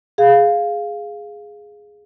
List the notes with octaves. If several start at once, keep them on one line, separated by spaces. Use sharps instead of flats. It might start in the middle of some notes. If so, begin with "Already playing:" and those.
G#4 F5